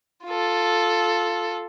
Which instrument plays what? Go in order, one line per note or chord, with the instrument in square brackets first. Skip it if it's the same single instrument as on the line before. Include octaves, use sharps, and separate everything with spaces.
[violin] F4 A4